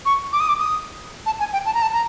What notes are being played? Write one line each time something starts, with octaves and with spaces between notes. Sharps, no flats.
C#6
D6
D#6
D6
D#6
A5
G#5
G5
A5
A#5
A5
A#5